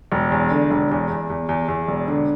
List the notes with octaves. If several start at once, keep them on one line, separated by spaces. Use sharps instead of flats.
E1
E2
D3
E1
E2
E2
E2
E2
E2
E1
D3